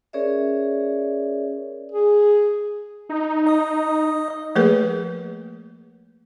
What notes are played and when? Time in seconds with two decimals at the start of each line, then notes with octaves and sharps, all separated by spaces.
0.13 C#4 G#4 A#4 C#5 D5 E5
1.92 G#4
3.09 D#4
3.47 D#5 D#6
4.55 F3 A3 A#3 G#4 A#4 B4